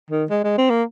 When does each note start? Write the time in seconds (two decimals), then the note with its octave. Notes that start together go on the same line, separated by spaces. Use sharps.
0.11 D#3
0.30 G#3
0.44 G#3
0.58 C4
0.70 A#3